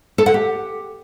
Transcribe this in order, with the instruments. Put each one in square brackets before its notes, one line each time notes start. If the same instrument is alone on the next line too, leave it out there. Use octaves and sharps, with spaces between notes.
[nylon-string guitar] A4
F#5
G4